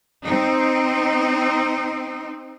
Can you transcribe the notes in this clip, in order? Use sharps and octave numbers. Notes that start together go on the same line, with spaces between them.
C4 D#4